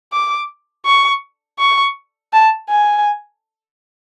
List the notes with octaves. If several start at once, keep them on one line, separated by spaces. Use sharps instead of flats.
D6
C#6
C#6
A5
G#5